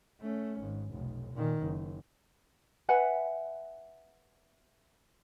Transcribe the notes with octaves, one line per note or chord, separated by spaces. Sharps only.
A3 C#4
G#1
F1 B1
A#2 D#3
F#1
B4 E5 F#5 G#5